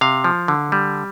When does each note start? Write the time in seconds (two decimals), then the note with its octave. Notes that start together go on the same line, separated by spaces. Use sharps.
0.01 C3 F5
0.24 F3
0.48 D3
0.72 G3